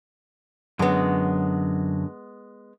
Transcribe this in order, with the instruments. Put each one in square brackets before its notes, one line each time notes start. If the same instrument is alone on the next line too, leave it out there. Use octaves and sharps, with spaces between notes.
[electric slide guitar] F#2 D3 F#3 [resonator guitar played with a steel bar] G#3 B3